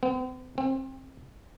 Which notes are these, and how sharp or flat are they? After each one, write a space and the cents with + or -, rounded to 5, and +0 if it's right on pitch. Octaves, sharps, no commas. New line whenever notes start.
C4 -45
C4 +25